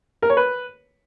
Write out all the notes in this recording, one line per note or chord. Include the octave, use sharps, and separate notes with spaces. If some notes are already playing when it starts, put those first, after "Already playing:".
A#4
C#5
B4